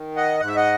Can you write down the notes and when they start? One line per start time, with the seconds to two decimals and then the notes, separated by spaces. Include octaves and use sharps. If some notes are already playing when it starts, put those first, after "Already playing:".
Already playing: D#3
0.17 D#5 F#5
0.40 G#2 F#5
0.48 E5
0.56 D#5 F#5